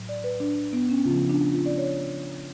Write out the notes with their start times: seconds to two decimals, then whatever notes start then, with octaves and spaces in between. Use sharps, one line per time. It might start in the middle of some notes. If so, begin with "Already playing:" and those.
Already playing: A2 F#3
0.09 D5
0.24 B4
0.40 D4
0.73 B3
0.90 C#4
1.05 C#3 F3 F4
1.29 D4
1.53 F4
1.66 D5
1.78 C#5